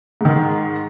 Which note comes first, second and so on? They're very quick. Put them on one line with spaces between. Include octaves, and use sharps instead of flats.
G#2 D#3 G#3